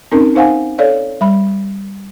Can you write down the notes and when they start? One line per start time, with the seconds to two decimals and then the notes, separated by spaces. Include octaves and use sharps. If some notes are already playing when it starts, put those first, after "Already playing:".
0.12 C4 C#4 D#4 A#4
0.35 D#4 C5 F5 F#5 G#5
0.78 A4 C#5 D5 F5
1.21 G3 B5